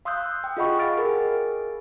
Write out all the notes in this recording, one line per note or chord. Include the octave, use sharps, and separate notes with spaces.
F5 C6 D#6 E6 F#6 G6
G5
F4 G#4 D#5 F#5 B5 C#6
G#4 F5 F6 A6 D7
G#4 A#4